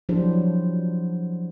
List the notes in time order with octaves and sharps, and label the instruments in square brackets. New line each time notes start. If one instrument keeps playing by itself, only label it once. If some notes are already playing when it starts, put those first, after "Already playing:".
[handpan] F3 F#3 D4 E4 G4 C5